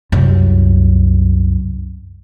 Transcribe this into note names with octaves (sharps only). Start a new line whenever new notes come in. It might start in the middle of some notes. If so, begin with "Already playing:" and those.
C2 F#2